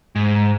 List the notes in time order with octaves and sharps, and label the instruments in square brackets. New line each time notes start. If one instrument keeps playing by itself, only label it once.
[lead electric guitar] G#2